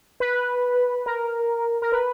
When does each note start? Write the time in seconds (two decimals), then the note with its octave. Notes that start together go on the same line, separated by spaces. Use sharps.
0.20 B4
1.06 A#4
1.82 A#4
1.92 B4